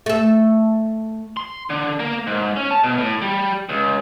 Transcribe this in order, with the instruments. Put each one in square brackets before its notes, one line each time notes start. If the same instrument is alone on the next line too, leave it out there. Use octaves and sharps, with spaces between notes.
[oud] A3 A4
[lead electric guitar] C6
D3
A#3
G#2
C#4
A5
B2
A2
G3
C#2